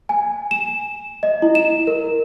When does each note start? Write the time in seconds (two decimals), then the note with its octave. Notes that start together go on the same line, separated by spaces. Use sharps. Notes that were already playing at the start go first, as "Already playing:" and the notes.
0.09 G#5
0.51 E7
1.23 D#5
1.42 E4
1.55 E7
1.87 A#4